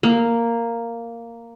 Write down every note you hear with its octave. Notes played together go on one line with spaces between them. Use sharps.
A#3